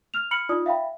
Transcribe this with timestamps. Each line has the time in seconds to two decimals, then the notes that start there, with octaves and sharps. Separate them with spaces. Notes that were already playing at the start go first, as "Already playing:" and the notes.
0.14 F6 F7
0.31 B5 F6 C#7 F#7
0.49 D#4 F4 D5 D#6
0.66 E5 F5 G5 B5